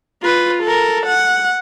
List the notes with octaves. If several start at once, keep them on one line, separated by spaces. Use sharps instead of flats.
F4 B4
A4 A#4
F#5